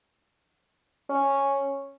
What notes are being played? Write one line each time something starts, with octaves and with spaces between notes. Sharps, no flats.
C#4